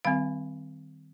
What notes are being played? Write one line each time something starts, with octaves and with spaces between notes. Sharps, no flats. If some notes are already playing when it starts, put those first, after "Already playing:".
D#3 G3 C4 F5